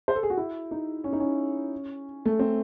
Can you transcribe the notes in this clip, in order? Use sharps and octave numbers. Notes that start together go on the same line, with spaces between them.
C5
A4
G#4
F#4
E4
D#4
C#4
D#4
C#4
A3
C4